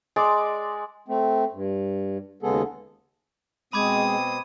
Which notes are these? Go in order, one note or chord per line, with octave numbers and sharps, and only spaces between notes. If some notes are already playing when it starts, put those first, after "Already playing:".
G#3 D5 D6
A3 C4
G2
D#2 C#3 G#3 B3 G#4 A4
B2 G#3 C4 B5 D6 D#6 G#6